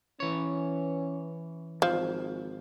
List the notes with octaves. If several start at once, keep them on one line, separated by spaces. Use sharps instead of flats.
E3 C#4 C#5
G#1 F3